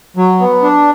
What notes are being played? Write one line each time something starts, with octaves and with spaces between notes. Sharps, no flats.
F#3
B3
D4